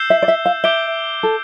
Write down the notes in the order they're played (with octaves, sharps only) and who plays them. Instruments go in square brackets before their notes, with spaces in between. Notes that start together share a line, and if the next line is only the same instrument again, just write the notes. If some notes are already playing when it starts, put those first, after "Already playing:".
Already playing: [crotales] E6 G6 C7 E7 G7
[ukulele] E5
D5
E5
F5
[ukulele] E5 [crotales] D6 G6 D7 G7
[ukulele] A4